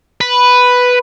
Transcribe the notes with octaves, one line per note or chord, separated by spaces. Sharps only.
B4